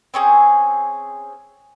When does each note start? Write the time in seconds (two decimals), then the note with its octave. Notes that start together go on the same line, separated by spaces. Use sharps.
0.14 C4 C#4 G#4